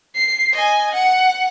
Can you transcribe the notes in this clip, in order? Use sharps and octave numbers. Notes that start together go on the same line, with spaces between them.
C7
D#5 G#5
F#5